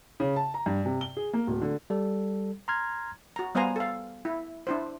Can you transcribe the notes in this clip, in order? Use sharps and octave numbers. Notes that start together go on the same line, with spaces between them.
C#3
A5
A#5
G2
C3
G7
G#4
A#3
D1
D3
G3 A4
A#5 C6 F6 G#6
F#4 A#5
G3 B3 C5 F5 G#5 A#5
A4 F5
E4
D4 E4 C5